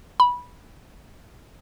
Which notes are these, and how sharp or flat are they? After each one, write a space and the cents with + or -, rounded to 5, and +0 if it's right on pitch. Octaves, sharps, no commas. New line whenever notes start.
B5 -15